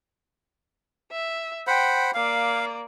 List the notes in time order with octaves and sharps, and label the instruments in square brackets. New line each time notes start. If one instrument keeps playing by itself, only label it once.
[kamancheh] E5
[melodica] C5 F#5 B5 [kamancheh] G5
[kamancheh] A#3 D5 [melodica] F5